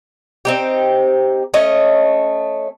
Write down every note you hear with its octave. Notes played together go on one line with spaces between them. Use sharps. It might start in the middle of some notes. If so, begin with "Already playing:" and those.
C4 D#4 G4
A3 C#4 D#5